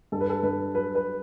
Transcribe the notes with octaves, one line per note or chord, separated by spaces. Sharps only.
G2 A4
B4
A4
G2 B4
F#3 B4
B4